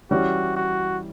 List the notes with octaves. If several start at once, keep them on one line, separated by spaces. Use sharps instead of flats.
E3 G3 C#4 F#4
F#4